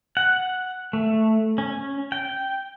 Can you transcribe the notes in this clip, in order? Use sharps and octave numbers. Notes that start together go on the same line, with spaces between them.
F#5
A3
C#4
G5